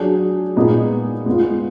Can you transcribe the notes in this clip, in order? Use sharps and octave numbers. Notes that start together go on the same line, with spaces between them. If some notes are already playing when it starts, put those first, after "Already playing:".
Already playing: F#3 D4 G#4
A#2 G#3 B3 D#4 G#4
G#3 B3 F4